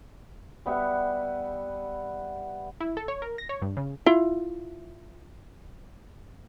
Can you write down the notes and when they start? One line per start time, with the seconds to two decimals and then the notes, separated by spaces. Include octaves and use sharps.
0.66 G3 B3 E5 F#5
2.81 E4
2.97 A4
3.08 C#5
3.22 A#4
3.38 A#6
3.49 C#5
3.62 G2
3.77 C#3
4.06 E4 F4